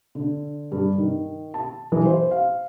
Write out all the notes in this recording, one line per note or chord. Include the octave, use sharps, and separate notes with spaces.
D3
G2
D#3
A5
E3
C5
F5